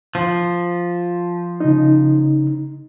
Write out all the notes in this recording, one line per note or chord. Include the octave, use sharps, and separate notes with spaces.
F3
C#3 D#4